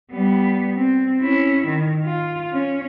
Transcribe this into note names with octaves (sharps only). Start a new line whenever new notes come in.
G3 B3
C4
C#4 E4
D#3
F4
C#4